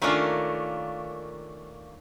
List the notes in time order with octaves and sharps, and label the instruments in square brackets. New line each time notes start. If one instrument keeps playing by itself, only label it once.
[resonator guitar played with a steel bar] D#3 A3 A#3 C#4 D4 F4